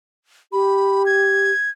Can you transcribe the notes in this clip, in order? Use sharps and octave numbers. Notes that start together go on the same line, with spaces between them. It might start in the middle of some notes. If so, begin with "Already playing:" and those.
G4 B5
G#6